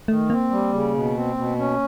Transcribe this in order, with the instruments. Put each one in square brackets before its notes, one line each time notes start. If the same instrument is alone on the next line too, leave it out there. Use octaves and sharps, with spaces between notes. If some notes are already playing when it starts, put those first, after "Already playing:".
[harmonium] D#3 [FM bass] A3
[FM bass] A#3 [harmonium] C4
[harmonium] G3
C#3
B2
C4
B2
C#4